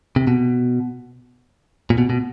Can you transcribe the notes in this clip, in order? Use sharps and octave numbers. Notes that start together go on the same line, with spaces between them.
C3
B2
A#2
B2
B2